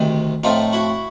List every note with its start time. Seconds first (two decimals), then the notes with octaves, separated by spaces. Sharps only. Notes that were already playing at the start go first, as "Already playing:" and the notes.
Already playing: D2 C3 D#3
0.44 A2 F3 A3 C4 D#4 F4
0.72 E4 F#4